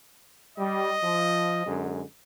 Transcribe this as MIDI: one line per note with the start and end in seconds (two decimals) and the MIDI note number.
0.58 0.94 55
0.58 1.74 75
1.03 1.63 53
1.66 2.02 42
1.66 2.02 50
1.66 2.02 56